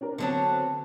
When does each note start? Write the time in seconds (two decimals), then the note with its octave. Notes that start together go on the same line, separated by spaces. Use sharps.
0.01 C#4 D4 A#4
0.18 D3 F#3 B3 C4 D4 A5